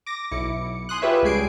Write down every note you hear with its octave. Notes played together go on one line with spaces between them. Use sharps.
D6 A#6
B1 E4 D6 C#7
G#5 C6 D#6 F#6
F4 G4 G#4 B4 C#5 E5
C#2 G3 G#3 G#5 C7 D7